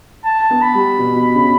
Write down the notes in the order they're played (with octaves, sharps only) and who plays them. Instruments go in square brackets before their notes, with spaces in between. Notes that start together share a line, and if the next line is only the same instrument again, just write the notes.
[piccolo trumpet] A5
[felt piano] B3
[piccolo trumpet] B5
[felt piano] G3
B2
B2
C#3